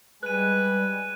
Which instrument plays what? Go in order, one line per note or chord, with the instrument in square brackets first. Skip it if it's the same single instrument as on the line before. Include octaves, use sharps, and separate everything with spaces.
[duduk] G3 [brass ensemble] G#3 G#5 [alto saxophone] B4 [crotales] F#6 D#7